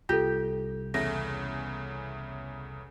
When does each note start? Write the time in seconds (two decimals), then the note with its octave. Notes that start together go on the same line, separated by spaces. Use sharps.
0.09 C2 F4 G4 A4
0.94 E2 C#3 A3 A#6